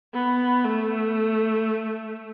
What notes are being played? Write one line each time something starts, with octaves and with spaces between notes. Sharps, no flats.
B3
A3